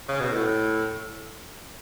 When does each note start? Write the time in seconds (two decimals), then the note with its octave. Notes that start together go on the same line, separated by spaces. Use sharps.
0.08 C#3
0.20 B2
0.32 A2